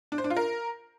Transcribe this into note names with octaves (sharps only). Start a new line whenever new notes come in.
D4
C5
D4
F4
A#4